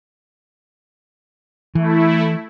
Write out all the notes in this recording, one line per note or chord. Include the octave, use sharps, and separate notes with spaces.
E3 A3 E4